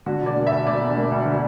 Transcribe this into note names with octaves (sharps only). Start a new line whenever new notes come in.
D3 F#4
E1
D5
A#3
D2 E5
D3 D5
E1
A#3
D2
D3